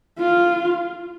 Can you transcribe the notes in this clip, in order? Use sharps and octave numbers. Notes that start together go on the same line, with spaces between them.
F4